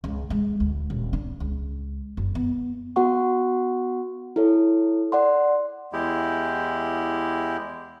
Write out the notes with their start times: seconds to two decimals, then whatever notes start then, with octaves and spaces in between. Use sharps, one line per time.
0.04 C#2
0.30 G#3
0.60 D2
0.90 D#1
1.13 D4
1.40 C#2
2.17 F#1
2.35 B3
2.96 B3 F#4 F#5 C#6
4.36 E4 A4 C#5
5.12 D5 F#5 C6
5.93 E2 G#3 E4 G4